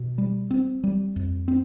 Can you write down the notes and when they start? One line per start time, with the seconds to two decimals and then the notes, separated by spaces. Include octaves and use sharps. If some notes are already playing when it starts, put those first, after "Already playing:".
Already playing: B2
0.18 G3
0.51 C4
0.84 G3
1.16 F2
1.48 C4